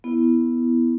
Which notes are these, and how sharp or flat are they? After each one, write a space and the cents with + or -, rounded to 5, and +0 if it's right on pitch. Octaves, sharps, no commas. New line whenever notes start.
B3 +0 E4 +0